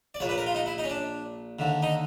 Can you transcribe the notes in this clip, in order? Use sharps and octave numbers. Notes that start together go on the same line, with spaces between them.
D5
A#1 A#2 C#5
B4
A#4
F4
D#4
E4
D#4
C#4
D4
D#2 D3
D#4